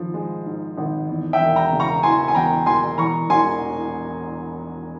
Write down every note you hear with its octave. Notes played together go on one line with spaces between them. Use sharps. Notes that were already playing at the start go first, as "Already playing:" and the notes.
Already playing: G#1 F3
G#3
G#2
G#1
E2
E5 G5
E1
G5 A#5
C#3
A#5 C#6
E3 G#5 C6
G#5
E2 G5 A#5
E1 G#5 C6
E2 A#5 C#6
E1 G#5 C6